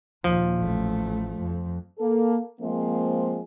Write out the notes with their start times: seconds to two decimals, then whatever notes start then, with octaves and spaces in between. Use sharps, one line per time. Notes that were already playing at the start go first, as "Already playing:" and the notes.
0.24 D#2 A#2 F3
0.59 A1 A3
1.40 F2
1.98 A#3 A4
2.60 F3 G#3 A#3 C4